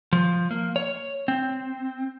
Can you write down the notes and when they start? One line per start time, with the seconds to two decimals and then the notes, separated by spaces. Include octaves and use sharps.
0.13 F3
0.51 A#3
0.76 C#5
1.28 C4